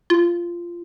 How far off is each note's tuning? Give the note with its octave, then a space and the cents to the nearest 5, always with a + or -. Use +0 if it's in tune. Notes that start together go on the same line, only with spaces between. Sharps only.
F4 -15